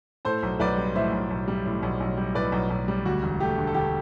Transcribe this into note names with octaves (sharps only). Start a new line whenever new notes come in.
A2 A4 C5
B1
B1 B4 D5
G3
A2 C5 E5
B1
B1
G3
A2
B1
B1
G3
A2 B4 D5
B1
B1
G3
D2 F#4
E1
A3 G4
D3
A4
D2 G4